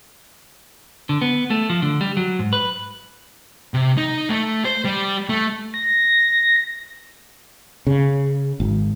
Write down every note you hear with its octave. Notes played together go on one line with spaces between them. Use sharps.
D3
B3
A3
F3
D3
G3
F#3
G#2
B4
C3
D#4
A3
C5
G3
A3
A#6
C#3
G#1